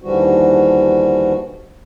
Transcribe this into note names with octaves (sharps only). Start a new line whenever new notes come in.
D#2 D3 E3 F3 G3 F#4